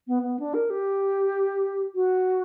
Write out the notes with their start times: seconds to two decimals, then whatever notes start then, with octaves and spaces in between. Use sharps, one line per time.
0.08 B3
0.23 B3
0.40 D4
0.54 A#4
0.70 G4
1.95 F#4